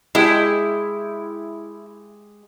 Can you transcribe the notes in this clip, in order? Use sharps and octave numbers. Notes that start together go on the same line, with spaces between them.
G#3 E4 G4